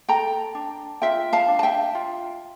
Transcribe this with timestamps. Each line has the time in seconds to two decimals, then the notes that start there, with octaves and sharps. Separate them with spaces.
0.09 A4 G5 A#5
0.55 D4
1.02 F4 E5 G5
1.33 F5 A5
1.48 D4
1.59 A5
1.63 E5 G5
1.95 F4